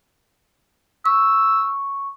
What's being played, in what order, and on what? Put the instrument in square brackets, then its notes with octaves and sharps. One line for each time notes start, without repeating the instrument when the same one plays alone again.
[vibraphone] C#6 [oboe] E6